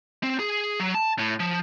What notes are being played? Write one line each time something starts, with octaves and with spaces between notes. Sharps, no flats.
C4
G#4
F#3
A5
A2
F3